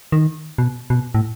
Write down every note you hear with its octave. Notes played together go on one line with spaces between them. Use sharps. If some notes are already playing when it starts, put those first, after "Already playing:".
D#3
B2
B2
A2